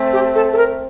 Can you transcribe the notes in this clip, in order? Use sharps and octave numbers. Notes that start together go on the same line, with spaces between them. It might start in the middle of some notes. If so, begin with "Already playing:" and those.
Already playing: A3 C4
G4
A4
A4
A#4